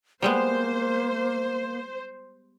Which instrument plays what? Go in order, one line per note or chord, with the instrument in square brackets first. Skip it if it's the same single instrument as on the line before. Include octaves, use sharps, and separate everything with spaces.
[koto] G3 G#3 B3 [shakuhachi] A#3 [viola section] C5